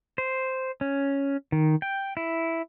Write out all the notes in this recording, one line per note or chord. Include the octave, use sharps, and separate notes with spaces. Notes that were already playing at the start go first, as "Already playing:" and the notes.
C5
C#4
D#3
G5
E4